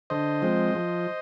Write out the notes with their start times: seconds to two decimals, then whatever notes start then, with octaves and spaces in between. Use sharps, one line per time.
0.10 D3 C5 D#5
0.42 F3 G#3 C4
0.75 F3